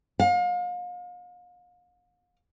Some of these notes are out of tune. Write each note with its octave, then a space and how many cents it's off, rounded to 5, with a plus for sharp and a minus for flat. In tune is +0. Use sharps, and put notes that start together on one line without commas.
F5 +40